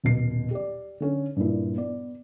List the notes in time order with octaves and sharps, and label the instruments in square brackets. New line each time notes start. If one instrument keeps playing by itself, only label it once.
[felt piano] D#1 B2 C7
G4 D5
D3 C#4 A4
G2 A#2 E4
B3 D5